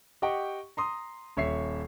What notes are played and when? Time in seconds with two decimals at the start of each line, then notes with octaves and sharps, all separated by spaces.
0.22 G4 D#5 F#5 G5 C#6
0.77 A#5 C6 D#6
1.37 D#1 C#5 E5 C7